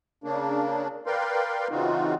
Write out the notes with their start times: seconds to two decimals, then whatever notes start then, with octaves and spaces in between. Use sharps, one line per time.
0.24 C#3 A#3 D4
1.06 A#4 B4 D5 F5 G5 C6
1.71 C#3 E3 C4 D#4 F4 F#4